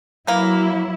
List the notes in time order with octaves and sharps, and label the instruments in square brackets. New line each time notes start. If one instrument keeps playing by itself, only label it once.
[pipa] E3 A#3 [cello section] F#3 E4